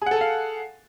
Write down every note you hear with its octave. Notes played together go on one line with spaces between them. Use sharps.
G#4 A4 F5 F#5 G#5